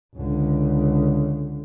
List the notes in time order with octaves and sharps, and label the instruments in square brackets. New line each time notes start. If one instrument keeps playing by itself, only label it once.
[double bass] C#2 D3